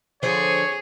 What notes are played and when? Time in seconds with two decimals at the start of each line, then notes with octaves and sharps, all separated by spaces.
0.23 D3 F3 G#4 C5 C#5